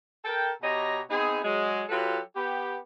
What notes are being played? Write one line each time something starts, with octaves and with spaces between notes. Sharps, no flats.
A4 A#4 G5
B2 G4 C#5 D#5 A#5
B3 C4 D#4 G#4
F#3 G#3
F#3 F4 G4 A4 B4
B3 G4